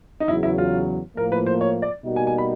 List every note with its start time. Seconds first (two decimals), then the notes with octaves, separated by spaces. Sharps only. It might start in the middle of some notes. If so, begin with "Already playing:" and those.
0.20 D#4
0.28 E2 C#3 F#3 E4
0.43 E4
0.58 F4
1.16 A2 F3 A#3 A#4
1.32 B4
1.46 C5
1.61 C#5
1.82 D5
2.04 B2 G3 A#3 D#4 F#4
2.16 G#5
2.27 G#5
2.38 B5